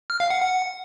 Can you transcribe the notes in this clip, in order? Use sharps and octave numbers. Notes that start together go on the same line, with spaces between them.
F6
F5
F#5
F#5